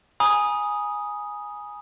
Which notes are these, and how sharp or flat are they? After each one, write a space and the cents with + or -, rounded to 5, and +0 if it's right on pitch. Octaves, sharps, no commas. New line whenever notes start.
G#5 +0 B5 -45 D#6 +0